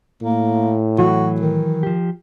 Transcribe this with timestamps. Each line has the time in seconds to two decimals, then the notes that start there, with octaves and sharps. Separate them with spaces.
0.23 A2 A#3
0.99 E3 F#3 F#4
1.40 D#3
1.83 F3 G4